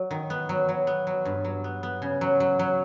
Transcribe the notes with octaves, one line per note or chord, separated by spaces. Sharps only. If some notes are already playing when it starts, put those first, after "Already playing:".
Already playing: F#3
D#3
B3
F#3
F#3
B3
F#3
G2
F#3
B3
B3
C#3
F#3
F#3
F#3